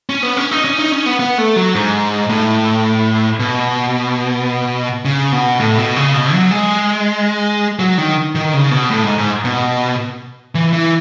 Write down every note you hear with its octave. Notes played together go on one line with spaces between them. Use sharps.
C#4
B3
C#4
D#4
C#4
D#4
C#4
B3
B3
A3
F#3
G#2
A2
B2
C#3
B2
A2
B2
C#3
B2
F#3
G#3
F#3
D#3
D#3
C#3
B2
A2
G#2
G#2
B2
E3
E3